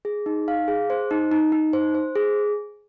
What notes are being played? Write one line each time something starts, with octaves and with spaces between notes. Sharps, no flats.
G#4
D#4
F5
G#4
C5
D#4
D#4
D#4
C5
C5
G#4